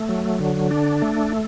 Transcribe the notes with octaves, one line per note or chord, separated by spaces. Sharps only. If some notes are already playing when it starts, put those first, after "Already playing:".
Already playing: A3
F#3
D3
D4
A3